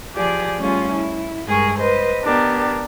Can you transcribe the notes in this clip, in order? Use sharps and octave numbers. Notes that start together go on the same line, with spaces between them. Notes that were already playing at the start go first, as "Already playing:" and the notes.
F3 G4 G#4 D5
G3 A3 C#4 F4 G#4
E4
G2 G#3 G#4 A#4 C#6
B4 C5 D#5
B3 D4 G4 A#4